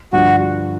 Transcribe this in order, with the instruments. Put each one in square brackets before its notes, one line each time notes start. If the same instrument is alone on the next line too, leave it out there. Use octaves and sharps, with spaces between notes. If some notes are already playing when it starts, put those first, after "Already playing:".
[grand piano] G2 D3 F3 [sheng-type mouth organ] F#4